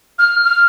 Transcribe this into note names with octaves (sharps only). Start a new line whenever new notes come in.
F6
F6